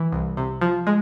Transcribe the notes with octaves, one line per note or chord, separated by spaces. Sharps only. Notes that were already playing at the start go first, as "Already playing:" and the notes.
Already playing: E3
C2
C3
F3
G#3